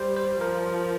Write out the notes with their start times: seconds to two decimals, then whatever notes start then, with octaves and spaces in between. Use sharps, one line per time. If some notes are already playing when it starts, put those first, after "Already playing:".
Already playing: G3 C5
0.16 C5
0.41 F3 A#4